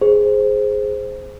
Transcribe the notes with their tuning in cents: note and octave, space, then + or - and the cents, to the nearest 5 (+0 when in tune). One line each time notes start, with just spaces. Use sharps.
G#4 +5 C5 +0